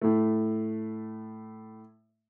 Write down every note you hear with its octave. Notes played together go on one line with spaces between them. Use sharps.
A2 A3